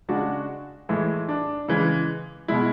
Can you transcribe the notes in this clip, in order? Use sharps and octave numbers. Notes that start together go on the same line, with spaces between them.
C#3 G#3 D4 F#4
A2 E3 G#3
D4
C#3 E3 G#3
B2 G#3 E4